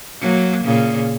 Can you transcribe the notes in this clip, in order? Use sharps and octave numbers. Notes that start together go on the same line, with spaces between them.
F#3 A#3
A#2 C#3